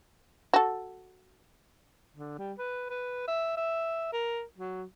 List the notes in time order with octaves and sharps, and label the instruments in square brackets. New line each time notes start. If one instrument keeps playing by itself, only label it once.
[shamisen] F#4 A4
[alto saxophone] D3
G3
B4
B4
E5
E5
A#4
F#3